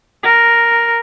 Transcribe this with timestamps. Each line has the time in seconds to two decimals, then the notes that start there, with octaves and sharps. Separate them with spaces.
0.23 A#4